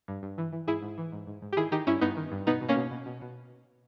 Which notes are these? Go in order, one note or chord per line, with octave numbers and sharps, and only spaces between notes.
G2
G2
E3
E3
G#2 E4 G#4
G#2
E3
G#2
G#2
G#2
G4
D#3 E4 G#4
D#3 D#4 G4
G2 C#4 E4
G2 B3 D#4
D#3
G2
B2 B3 D#4
B2
A#3 C#4
B2
B2
B2
B2